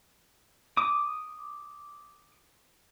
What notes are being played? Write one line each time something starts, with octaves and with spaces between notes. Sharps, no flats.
D6 D#6